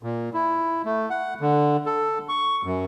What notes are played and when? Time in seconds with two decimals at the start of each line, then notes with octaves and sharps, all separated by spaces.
0.03 A#2
0.34 E4
0.85 A3
1.10 F#5
1.40 D3
1.86 A4
2.29 C#6
2.64 F#2